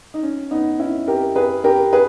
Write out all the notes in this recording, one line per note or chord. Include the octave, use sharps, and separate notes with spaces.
D#4
C#4
B3 D#4
C#4 E4
G4 A#4
G#4 B4
G4 A#4
G#4 B4